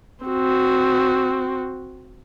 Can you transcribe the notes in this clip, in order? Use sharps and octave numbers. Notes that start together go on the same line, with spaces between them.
C4 F#4